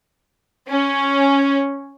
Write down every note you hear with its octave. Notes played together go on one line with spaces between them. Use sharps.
C#4